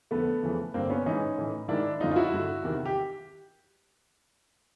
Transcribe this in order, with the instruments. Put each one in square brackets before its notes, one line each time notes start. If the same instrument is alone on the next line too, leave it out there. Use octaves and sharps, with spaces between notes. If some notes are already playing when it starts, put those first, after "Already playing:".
[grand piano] F2 D3 A3 B3
F2 C#3 E3
G2 D3 A#3 C4
B3 C#4
G#2 E3 C#4 D#4
A2 E3
G#2 D#3 D4 E4
F#2 D3 D#4 F4
F4
E4 F#4
G2 D3
E2 C3 D#3
G4